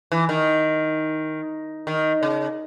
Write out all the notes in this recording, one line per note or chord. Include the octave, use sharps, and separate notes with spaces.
E3
D#3
D#3
C#3